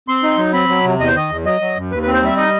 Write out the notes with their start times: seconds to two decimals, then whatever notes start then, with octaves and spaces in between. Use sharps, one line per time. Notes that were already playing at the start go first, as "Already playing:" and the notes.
0.08 C4 C6
0.23 D#4
0.38 F#3
0.53 C4 B5
0.69 F#3
0.85 C3
0.99 E2 D#5
1.08 C5
1.14 D#3 D#5
1.30 E2
1.45 F#3 D#5
1.61 F#3
1.76 F#2
1.91 D#2 B4
2.03 B4
2.06 C4
2.14 C5
2.22 G3 E5
2.37 D#4 D#5